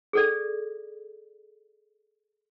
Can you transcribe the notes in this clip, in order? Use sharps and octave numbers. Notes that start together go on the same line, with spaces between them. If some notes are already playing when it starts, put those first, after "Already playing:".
G#4 A4 D5